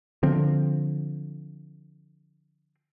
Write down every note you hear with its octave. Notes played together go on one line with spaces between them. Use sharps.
D3 F3 C4